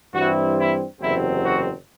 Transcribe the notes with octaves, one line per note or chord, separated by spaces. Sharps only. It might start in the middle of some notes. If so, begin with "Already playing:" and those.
G2 E3 G3 C4 E4 F#4
E4
F#1 E2 C3 F#3 C4 E4
F#4